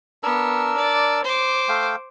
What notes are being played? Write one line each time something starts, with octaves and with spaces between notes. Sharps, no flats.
B3 D4 A#4 E6
D5
C5 D6
A3 F5 G5